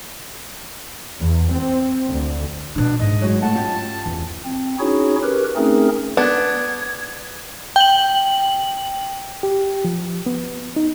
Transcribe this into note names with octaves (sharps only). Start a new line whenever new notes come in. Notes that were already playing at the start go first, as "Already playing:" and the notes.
E2
C4
D2
B2 C#4 D4
G#2 D#5
F#3 G#3 F#4
G3 A3 F#5 A5
C#4 F4 G4
E2
C4
C#4 D#4 E4 F#4 G#4 C#5
G4 A#4 B4
A3 C4 C#4 D#4 G#4 A#4
B3 D4 G#6
G5 F#7
G4
F3
B3
D#4